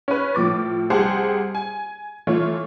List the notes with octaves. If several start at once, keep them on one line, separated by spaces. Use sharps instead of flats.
C#4 B4
A2 F3 D6 A6
C2 G4 G#4 C5 F#5 A5
G#5
E3 A3 F4 C#5